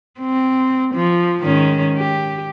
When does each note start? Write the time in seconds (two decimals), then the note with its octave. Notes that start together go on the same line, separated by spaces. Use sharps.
0.20 C4
0.95 F3
1.43 G#2 D#3 C#4
1.96 G4